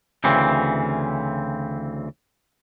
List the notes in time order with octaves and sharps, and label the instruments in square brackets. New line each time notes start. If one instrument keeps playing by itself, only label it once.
[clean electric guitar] D2 C#3 E3 C4